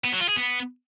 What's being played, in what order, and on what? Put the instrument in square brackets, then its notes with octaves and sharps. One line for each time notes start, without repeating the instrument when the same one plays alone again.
[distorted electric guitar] B3
F#3
F4
G#4
B3